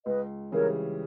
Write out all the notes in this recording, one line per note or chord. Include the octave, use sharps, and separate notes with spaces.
C#2 B4 D#5
C#3 E3 G3 C#4 A#4 C#5